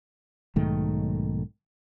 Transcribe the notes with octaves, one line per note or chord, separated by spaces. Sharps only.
B1 G#2 D#3 A3